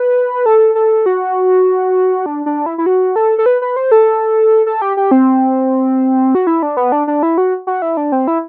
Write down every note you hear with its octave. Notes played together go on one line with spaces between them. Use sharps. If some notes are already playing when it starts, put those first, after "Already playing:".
Already playing: B4
A4
A4
F#4
D4
D4
E4
E4
F#4
A4
A4
B4
B4
C5
A4
A4
G4
G4
C4
F#4
E4
D4
B3
D4
D4
E4
F#4
F#4
E4
D4
C4
E4